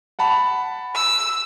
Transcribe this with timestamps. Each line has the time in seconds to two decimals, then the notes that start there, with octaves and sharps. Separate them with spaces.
0.19 F#5 A5 B5
0.95 E6